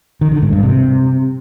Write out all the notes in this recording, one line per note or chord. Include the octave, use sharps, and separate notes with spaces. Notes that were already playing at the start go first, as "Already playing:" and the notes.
D#3
D3
G#2
G2
C3